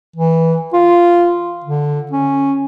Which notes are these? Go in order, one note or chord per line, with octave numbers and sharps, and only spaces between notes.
E3
F4
D3
C#4